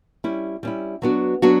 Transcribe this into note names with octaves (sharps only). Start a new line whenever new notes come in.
G3 C#4 E4
G3 C#4 E4
F#3 B3 D4 F#4
F#3 B3 D4 F#4